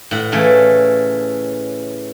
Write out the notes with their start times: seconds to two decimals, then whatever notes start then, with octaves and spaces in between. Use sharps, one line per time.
0.11 A2 F#5
0.32 C#3 E3 A3